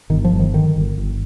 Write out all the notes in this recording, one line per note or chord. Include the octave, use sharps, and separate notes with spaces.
G1 D#3
F3
G1
D#3
D3 D#3
G1
G1